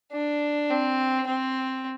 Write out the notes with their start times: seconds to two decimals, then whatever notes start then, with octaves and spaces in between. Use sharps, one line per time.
0.12 D4
0.70 C4
1.26 C4